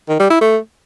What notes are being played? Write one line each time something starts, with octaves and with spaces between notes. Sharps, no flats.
D#3
G3
E4
A3